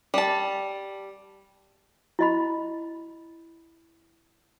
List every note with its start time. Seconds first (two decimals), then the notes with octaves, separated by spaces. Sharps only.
0.14 G3 A5
2.19 E4 D#5 B5